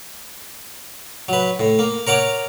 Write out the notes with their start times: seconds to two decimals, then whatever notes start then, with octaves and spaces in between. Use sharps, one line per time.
1.29 F#3 B4
1.59 A2
1.79 A#3
2.07 A#4 C#5 F#5 D6